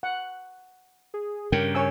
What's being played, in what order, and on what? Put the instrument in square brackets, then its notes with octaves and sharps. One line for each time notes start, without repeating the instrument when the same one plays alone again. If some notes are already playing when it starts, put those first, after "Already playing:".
[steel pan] F#5
[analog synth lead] G#4
[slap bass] G2 C#3 [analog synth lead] A#4 [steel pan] G5
[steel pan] C#5 G#5 E6